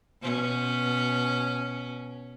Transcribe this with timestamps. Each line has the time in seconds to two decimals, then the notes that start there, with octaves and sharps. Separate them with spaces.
0.22 B2 C#4